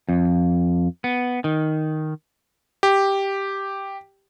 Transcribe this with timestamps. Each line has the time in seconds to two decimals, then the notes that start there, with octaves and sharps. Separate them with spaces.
0.09 F2
1.04 B3
1.44 D#3
2.83 G4